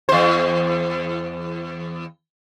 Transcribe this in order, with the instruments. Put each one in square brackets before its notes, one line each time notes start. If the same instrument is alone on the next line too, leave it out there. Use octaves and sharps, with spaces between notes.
[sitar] E2 C5